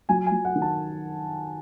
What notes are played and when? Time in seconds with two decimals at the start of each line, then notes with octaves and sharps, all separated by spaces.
0.09 F#3 G#5
0.26 G#5
0.32 F#3
0.45 F#5
0.55 D#3
0.62 A5